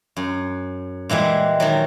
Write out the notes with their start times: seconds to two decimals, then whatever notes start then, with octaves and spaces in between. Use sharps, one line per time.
0.16 F#2
1.09 A#2 E3 G3 G#3
1.60 D#3 E3 F#3